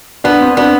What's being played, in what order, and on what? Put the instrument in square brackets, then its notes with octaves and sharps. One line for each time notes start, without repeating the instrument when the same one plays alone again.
[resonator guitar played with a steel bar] B3 [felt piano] D4
[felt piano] C4
[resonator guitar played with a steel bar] B3 [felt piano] D4